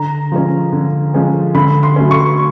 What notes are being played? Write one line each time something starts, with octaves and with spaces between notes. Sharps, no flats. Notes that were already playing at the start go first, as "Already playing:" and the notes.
Already playing: D3 A#5
F3 G#3 C#4
D3
F3 G#3 C#4
D3 B5
C6
F#3 A3 C#4
C#6